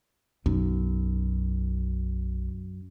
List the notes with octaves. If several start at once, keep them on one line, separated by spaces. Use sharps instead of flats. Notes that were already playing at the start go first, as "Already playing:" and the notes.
B1 F#2